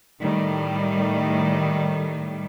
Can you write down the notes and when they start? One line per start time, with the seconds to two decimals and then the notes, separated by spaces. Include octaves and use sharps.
0.20 A2 D#3 G3 A3